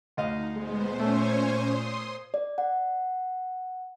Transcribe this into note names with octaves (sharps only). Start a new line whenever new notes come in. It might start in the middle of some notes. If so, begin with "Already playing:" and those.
D2 D#4 D#5 F5
A#2 G#3 B3 C5
A3 C#4 C#5 G#5 C#6
C6 D#6
D5
F#5